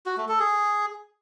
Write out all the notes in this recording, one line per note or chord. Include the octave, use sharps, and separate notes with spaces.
F#4
A3
A4
G#4